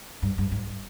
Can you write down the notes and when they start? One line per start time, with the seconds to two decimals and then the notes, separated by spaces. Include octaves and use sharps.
0.22 G2
0.38 G2
0.52 G#2